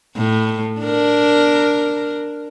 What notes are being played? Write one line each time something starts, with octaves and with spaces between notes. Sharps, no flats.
A2
D4 A#4